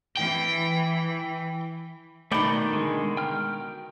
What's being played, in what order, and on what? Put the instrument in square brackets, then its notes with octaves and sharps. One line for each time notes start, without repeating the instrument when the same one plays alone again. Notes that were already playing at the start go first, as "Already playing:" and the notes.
[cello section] E3 [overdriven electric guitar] G5
[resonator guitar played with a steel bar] B2 D#3 [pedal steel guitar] A3 D5 G5
[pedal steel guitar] D3 G#3
G5 F6